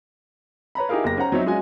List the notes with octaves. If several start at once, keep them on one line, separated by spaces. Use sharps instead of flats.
B4 C#5 A#5 B5
D#4 E4 G4 G#4 A#4 F5
F#1 A#3 G4 A#6
C#4 C5 F#5 A#5
F#3 C4 D#4 C#5 E5
G#3 C#4 F4 F#4 D#5 G#5